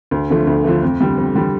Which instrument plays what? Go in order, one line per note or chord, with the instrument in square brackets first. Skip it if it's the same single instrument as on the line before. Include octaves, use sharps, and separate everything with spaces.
[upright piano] D2
D3 F3 A3
D2
D3 F3 A3
F2
D3 G3
F2
D3 G3